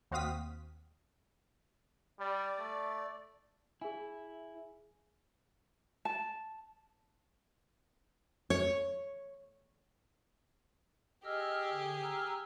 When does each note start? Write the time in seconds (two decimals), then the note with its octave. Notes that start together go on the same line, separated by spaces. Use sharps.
0.11 D#2 C4 F#4 F5 D#6 B6
2.20 G3 D5
2.59 A3
3.81 E4 G#4 G#5
6.05 A5
8.50 C#5
11.25 G4 G#4 D#5 E6 F6
11.71 D3
12.02 A#5 E6 F6